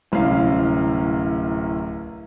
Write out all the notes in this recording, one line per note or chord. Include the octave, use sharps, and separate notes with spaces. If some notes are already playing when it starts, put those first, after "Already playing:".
D1 C2 C#4 F5